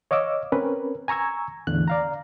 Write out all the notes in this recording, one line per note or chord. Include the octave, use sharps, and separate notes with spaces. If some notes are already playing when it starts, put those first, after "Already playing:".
C#5 D#5 F5 D6 E6
C4 C#4 A#4 B4
G#5 A#5 C#6 E6 G#6
E2 A2 D3 F#6
D5 F5 A#5